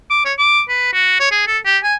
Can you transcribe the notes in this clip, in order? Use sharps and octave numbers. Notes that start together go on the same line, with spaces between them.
D6
C#5
D6
B4
F#4
C#5
G#4
A4
G4
G#5